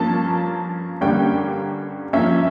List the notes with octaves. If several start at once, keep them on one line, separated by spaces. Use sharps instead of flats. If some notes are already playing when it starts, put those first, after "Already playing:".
Already playing: G2 F3 A#3 C#4 A5
G2 D3 G3 A#3 C#4 G5
G2 F3 A#3 C#4 E5